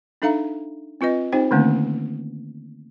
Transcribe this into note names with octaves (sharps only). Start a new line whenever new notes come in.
D4 D#4 A4 E5 F5 A#5
C4 F4 B4 D#5
C4 D#4 G4 C5 G5
D3 D#3 A3 A#3 C4 C#4